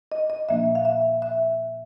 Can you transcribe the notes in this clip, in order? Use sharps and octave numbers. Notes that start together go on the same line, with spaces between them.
D#5
D#5
A#2 F3 A#3 D4 E5
F5
E5
E5